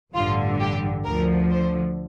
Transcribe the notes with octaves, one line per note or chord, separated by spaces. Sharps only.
A1 G2 D3 F4
G4
D2 D3 F3 A#4
C5